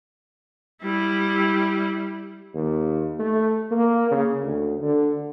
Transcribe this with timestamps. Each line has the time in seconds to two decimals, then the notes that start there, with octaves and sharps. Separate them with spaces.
0.83 G3 E4
2.54 D#2
3.19 A3
3.71 A#3
4.11 C#3
4.42 D2
4.81 D3